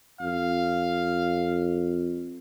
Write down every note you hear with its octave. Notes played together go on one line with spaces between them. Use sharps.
F2 F5